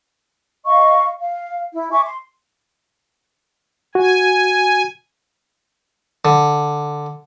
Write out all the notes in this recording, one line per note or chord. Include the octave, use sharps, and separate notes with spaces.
D#5 F5 C#6
F5
E4
E5 G#5 C#6 D6
C6
F#4 G#5
D3